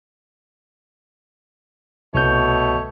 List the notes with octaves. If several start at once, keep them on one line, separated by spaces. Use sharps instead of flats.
C2 B2 A3 C#5 G6